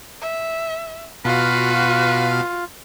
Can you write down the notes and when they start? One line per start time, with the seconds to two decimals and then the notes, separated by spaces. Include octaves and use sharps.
0.22 E5
1.25 B2 F4 F#4 B4 F5